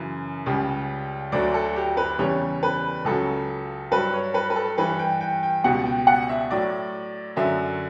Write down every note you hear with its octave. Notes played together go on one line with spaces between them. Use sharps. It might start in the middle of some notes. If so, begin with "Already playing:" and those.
Already playing: F#2 C#3 E3
C#2 C#3 G3
D2 D3 F#3 D5
A4
G4
B4
E2 C#3 E3 G3 C#5
B4
C#2 C#3 F#3 A4
G2 F#3 B4
C#5
B4
B4
A4
G2 E3 G3 B4
G5
G5
G5
C#2 B2 G3 F#5
G5
F#5
E5
A2 F#3 D5
F#2 D3 F#3 E5